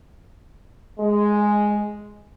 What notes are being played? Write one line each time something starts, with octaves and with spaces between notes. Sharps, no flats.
G#3